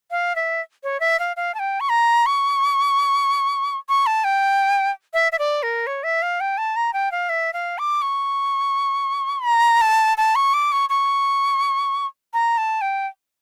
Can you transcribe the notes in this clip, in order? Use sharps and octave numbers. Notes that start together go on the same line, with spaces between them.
F5
E5
C#5
E5
F5
F5
A5
G5
C#6
A#5
C#6
C#6
A5
G5
E5
E5
D5
A#4
C#5
E5
F5
G5
A5
A#5
G5
F5
E5
F5
D6
C#6
A#5
A5
A5
C#6
D6
C#6
C#6
A#5
A5
G5